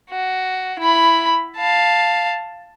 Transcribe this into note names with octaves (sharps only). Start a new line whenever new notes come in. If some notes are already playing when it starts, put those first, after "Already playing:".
F#4
E4 B5
F5 A5